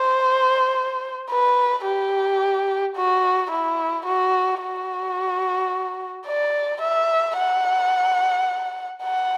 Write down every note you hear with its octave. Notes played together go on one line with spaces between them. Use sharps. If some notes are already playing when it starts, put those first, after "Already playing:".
Already playing: C5
B4
G4
F#4
E4
F#4
F#4
D5
E5
F#5
F#5